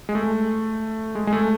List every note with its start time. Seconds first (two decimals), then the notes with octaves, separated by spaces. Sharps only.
0.09 G#3
0.15 A3
1.15 G#3
1.27 G#3
1.33 A3